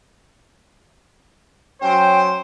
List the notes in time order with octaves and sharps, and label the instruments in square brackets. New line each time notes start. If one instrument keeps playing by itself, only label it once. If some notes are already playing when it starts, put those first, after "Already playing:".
[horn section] F#3 C#4 C5 [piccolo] G5